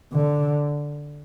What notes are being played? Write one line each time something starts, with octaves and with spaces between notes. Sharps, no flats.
D3